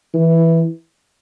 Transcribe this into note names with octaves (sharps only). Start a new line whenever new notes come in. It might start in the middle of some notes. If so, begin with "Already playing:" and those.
E3